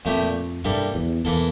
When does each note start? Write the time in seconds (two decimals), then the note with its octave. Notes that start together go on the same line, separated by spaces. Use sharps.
0.05 F2 A#2 A3 E4 G4
0.65 G2 G3 A#3 E4 A4
0.95 E2
1.24 E2 E3 A#3 E4 A4